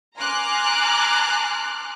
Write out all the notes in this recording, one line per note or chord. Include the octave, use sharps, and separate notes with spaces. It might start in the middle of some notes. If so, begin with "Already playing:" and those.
G#5 A#5 C6 D6 F6 F#6